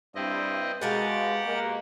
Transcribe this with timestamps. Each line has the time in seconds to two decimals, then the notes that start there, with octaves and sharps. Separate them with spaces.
0.15 G2 C4 E4 D#5
0.81 B2 G#3 G4 A#4 F5 F#5 A6
1.46 G#3 A#3